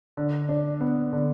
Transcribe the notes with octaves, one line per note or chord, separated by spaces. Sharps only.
D3
D4
B3
D3